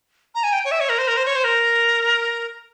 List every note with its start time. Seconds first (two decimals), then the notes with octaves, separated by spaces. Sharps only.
0.35 A#5
0.44 G#5
0.53 G5
0.65 C#5
0.71 E5
0.80 C#5
0.89 A#4
0.98 C5
1.08 A#4
1.17 C5
1.26 C#5
1.35 C5
1.44 A#4